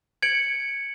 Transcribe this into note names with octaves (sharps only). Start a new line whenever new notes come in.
G#6 C#7 D7 F#7